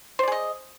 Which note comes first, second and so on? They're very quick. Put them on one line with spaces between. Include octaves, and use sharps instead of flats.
C5 D5 G#4 D#5